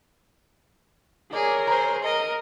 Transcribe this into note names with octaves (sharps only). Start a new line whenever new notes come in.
G#4 A#4 C#5 D5
G#4 C5 A#5
A#4 D#5